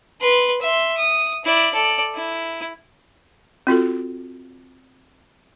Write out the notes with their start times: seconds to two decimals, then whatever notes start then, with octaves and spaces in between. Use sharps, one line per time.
0.21 B4 C6
0.61 E5 C6
0.98 D#6
1.44 E4 D5
1.74 A4 D5
2.15 E4
3.67 C4 F4 F#4 A4